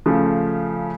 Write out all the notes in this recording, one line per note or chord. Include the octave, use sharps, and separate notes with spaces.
C#3 F3 A3